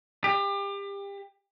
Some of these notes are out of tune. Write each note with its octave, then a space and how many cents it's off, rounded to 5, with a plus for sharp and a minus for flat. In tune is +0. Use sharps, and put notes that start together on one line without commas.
G4 +30